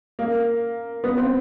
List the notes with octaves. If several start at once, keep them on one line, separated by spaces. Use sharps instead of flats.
A#3
B3
C4